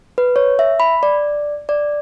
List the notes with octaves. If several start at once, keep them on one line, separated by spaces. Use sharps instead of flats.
B4
C#5
E5
B5
D5
D5